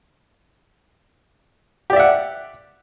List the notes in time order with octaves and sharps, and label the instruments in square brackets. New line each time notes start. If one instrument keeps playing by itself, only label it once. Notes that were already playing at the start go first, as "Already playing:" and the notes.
[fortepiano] G4
D5
E5
F#5